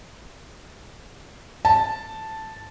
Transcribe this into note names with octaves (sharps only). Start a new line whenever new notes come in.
A5